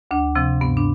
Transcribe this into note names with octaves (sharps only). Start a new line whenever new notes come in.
D2 D4
C3 F3 C4
G2 B3
D4